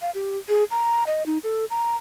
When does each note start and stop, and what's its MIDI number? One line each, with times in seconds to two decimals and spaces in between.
0.02 0.11 77
0.15 0.38 67
0.49 0.64 68
0.71 1.04 82
1.07 1.26 75
1.26 1.38 63
1.44 1.65 69
1.70 1.96 82